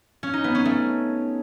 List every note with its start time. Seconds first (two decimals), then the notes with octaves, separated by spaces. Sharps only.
0.23 C#4
0.33 D#4
0.44 B3
0.55 C#4
0.65 A3